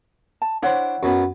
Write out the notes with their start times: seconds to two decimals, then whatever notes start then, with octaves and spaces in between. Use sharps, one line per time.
0.42 A5
0.63 D4 E4 C5 C#5 F#5
1.03 F#2 F#3 B3